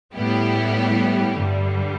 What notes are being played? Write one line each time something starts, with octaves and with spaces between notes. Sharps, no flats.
A2 G3 B3 E4 G4
G2 D3 G3